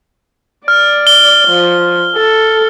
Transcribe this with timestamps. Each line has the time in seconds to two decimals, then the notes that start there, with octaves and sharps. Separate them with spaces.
0.68 D5 F6
1.07 G7
1.48 F3
2.16 A4